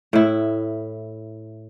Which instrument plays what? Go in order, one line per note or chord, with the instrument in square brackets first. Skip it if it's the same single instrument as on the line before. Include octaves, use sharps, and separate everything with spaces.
[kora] A2 E4